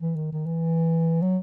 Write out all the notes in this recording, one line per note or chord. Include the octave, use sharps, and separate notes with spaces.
E3
D#3
D#3
E3
F#3